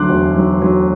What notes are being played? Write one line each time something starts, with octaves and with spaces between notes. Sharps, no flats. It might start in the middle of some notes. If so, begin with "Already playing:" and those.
Already playing: D2 D3 F#3 C6 D6 F#6
E1
F#3
F#3